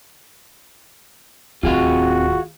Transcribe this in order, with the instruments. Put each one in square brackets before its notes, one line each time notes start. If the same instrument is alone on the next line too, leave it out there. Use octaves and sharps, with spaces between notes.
[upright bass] D1 D#2 [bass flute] C4 [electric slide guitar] F4 G#4 F5 [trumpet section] F#4